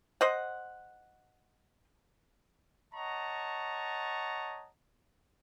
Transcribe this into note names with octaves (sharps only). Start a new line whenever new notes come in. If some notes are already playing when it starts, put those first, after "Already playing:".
C5 D#5 F#5
C#5 D#5 F#5 A5 A#5 C#6